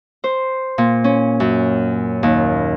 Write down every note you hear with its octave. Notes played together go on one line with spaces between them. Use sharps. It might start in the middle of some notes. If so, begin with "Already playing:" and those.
C5
A#2
C#4
F#2
D#2